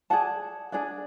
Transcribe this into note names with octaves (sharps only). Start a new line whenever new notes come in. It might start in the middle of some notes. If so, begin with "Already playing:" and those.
G#4 D5 F#5 A5
D4 G#4 D5 F#5